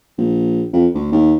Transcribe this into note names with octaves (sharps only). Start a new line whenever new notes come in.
A#1
F2
D2
D#2